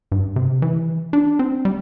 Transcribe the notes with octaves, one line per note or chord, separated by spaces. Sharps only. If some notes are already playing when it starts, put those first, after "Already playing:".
G2
C3
E3
D4
C4
G3